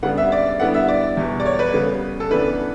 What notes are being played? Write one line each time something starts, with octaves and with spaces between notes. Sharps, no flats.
C#3 G3 B3 D4 F#5
E5
D5
D3 G3 B3 E4 F#5
E5
D5
E2 B2 G3
D5
C#5
B4
C#3 G3 B3
A4
C#3 E3 B3 D4 B4